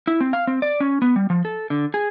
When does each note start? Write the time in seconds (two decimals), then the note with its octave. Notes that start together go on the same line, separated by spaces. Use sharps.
0.07 E4
0.21 C4
0.33 F5
0.47 C4
0.62 D5
0.80 C#4
1.02 B3
1.16 G3
1.30 F3
1.45 A4
1.70 D3
1.94 G#4